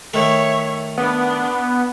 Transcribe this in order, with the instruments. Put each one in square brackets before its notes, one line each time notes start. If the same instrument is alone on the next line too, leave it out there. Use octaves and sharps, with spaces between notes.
[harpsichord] D#3 A3 [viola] C#5 E5
[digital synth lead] B3 [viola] D4